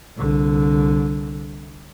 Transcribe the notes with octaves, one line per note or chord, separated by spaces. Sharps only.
C2 D3